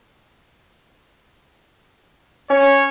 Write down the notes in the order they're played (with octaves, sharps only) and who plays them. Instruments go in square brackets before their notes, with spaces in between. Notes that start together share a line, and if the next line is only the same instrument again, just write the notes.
[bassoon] C#4 [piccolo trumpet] C#5